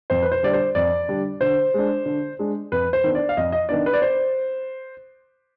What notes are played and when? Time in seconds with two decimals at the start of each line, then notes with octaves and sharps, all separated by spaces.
0.10 F2 C5
0.23 B4
0.32 C5
0.43 D3 G3 D4 D5
0.53 C5
0.75 F2 D5
1.08 D3 G3 D4
1.41 D3 C5
1.74 G#3 D4
2.06 D3
2.39 G#3 D4
2.72 F2 B4
2.93 C5
3.04 D#3 B3 D4
3.15 D5
3.29 F5
3.37 F2 D#5
3.52 D#5
3.69 D#3 B3 D4 D5
3.86 B4
3.93 D5
4.02 C5